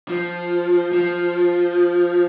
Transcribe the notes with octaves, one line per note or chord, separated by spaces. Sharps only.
F3
F3